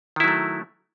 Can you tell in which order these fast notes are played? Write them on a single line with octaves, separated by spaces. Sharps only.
D#3 E4 F#3 A3